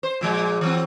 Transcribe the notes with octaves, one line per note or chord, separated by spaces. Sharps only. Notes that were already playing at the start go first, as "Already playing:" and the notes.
C5
A#2 F3 G#3
E3 F#3 C4